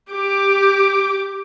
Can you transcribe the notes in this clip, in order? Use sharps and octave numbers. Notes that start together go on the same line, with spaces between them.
G4 D6